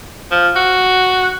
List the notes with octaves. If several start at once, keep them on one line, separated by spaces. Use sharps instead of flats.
F3
F#4